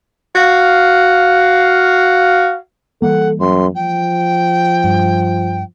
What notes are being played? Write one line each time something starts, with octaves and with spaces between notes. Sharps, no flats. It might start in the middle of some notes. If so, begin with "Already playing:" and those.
F#4 F5
E3 G3 A#3 A4 F#5
F#2 C6
F3 G5
G2